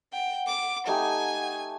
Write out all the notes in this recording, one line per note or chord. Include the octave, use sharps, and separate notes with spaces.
F#5 G5
D6
A3 D#4 G4 G#5